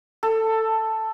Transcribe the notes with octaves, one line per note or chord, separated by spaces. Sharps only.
A4